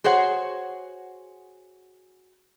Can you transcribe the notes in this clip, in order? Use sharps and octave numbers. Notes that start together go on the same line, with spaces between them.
F#4 G#4 C5 C#5 F#5